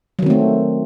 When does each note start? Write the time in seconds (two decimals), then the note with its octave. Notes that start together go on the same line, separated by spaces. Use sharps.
0.19 F#3
0.22 D#3
0.26 C4
0.30 A3